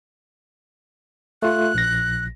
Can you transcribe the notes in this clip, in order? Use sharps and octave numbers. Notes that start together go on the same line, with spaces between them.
A3 F4 F#6
A#1 A#6